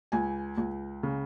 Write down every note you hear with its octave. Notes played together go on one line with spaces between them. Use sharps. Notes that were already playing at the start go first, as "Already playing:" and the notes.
C#2 G#5
C#2
C#3